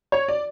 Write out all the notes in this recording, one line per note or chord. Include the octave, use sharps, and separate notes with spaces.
C#5
D5